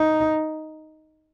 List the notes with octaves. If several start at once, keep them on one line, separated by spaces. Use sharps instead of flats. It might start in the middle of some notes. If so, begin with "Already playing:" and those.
Already playing: D#4